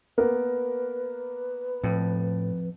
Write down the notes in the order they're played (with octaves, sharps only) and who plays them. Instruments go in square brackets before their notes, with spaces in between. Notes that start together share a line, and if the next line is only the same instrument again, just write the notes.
[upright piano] A#3 B3 A#4 [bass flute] B4
[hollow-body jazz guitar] F2 [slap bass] A2